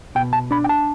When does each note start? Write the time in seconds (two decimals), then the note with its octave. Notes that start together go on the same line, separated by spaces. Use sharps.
0.15 B2 G5
0.33 A5
0.51 D4 B5
0.64 G5
0.69 A5